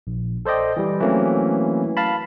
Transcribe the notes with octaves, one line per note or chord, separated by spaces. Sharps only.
A#1
A4 C5 D5 D#5 G5
E3 G3
E3 F#3 A3 A#3 C4 C#4
F5 A5 B5